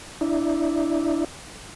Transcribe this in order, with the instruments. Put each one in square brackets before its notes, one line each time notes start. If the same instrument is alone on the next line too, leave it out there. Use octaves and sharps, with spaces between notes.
[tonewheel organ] D4 E4